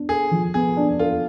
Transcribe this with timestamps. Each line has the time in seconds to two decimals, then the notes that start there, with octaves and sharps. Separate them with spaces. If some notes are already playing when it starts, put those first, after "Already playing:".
Already playing: B3 D4
0.09 G#4 A4
0.31 F3
0.54 B3 G#4
0.77 D4
0.99 F4 A4